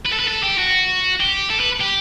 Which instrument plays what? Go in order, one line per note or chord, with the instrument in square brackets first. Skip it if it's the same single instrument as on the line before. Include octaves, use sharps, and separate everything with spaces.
[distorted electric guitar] B4
A4
B4
A4
G4
F#4
G4
A4
B4
G4